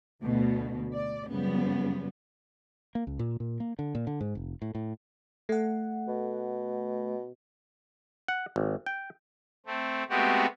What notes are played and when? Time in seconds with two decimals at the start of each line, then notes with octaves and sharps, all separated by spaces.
0.23 D2 B2
0.94 D5
1.29 F#2 C#3 F3 G3 B3
2.95 A#3
3.07 C#2
3.19 A#2
3.40 A#2
3.60 A#3
3.79 D3
3.95 A#2
4.07 D3
4.21 G#2
4.35 F1
4.62 A2
4.75 A2
5.49 A3 F#5
6.08 B2
8.28 F#5
8.56 G#1
8.86 G5
9.66 A3 C4
10.10 G#3 A3 B3 C4 F#4 G4